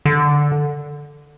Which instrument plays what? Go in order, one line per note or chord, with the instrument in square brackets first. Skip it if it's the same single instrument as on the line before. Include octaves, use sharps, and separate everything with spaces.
[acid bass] D3